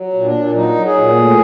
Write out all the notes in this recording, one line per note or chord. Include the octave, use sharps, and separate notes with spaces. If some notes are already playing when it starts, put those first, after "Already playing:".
Already playing: F#3
A#2
D4
A#2
F#3 D#4
F#3
G#4
A#2
A2